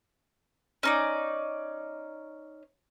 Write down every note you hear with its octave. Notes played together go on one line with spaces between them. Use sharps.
C#4 D#4 D5